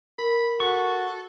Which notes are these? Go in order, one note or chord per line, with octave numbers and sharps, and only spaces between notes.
A#4 B5
F#4 A4 C#6